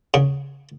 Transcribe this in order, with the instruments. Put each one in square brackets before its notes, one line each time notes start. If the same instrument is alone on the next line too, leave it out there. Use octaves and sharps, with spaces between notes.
[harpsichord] C#3